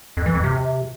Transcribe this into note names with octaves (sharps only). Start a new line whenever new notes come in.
F2
E3
F2
C3